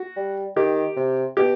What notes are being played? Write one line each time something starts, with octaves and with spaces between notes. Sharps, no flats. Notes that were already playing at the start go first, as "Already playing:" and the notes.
Already playing: F#4
G3
D#3 G4
C3
B2 G4